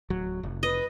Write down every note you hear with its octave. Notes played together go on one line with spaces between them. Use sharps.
D1 F#3
F1
B4 D#5